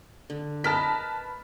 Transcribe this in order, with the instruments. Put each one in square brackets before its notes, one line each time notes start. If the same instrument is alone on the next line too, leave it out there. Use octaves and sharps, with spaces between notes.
[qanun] D3
[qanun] A#4 D#5 [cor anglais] B4 [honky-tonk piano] A5 F6 B6